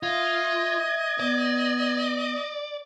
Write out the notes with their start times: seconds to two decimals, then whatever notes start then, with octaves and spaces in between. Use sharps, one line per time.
0.03 F4 D#5 E5 G#6
1.20 B3 D5